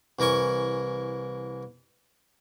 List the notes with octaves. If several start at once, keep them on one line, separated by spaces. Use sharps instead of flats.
C2 E3 A#4 G#5 C#6